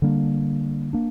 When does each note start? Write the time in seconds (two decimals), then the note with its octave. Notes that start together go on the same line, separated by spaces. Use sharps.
0.02 D3 G3 A#3 D4
0.93 A#3 D4